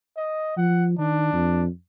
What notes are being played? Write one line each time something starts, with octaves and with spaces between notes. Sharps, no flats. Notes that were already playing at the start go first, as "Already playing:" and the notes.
D#5
F3 F#5
D#3 D4
F2